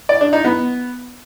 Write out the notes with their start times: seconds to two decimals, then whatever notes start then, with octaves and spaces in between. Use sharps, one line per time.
0.09 D5
0.21 D4
0.33 D#4
0.44 B3